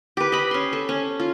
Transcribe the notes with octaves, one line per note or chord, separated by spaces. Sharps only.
G4 B4
D#5 B5
C#4 C6
A4
C#4
F4